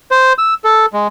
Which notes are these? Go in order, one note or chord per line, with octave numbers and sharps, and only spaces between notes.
C5
E6
A4
G#3